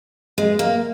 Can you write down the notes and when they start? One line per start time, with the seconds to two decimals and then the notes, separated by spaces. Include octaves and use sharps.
0.38 G#3
0.59 A#3